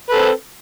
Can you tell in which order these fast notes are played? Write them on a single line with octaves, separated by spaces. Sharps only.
B4 A4 C4